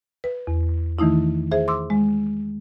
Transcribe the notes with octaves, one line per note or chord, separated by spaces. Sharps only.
B4
E2
D#3 E3 A3 D#4 E4
G#4 C5 E5
C6 D6 E6
G#3